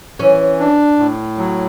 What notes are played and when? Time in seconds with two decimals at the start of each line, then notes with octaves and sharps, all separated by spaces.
0.19 E3 C#4
0.60 D4
0.99 A2
1.38 F#3